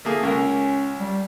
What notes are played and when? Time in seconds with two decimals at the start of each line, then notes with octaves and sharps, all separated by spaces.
0.05 A3 A#3 G#4
0.23 C#2 C#4 A#4
0.98 G3